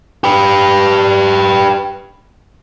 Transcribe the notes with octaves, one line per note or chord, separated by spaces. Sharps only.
G4 B4